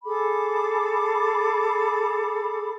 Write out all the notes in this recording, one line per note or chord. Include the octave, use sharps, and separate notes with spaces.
G#4 A4 B5 D6